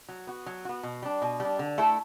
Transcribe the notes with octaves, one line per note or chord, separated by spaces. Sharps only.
F#3
B3 F#4
F#3
B3 F#4
B2
G3 D4
B2
G3
D4
D3
A3 E4 A4